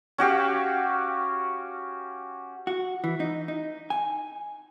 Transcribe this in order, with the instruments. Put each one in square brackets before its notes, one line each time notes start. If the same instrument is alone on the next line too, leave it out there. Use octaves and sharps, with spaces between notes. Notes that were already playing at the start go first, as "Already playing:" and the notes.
[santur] C#4 F#4 G4 F5
[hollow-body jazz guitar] F#4
E3
D#4
D#4
G#5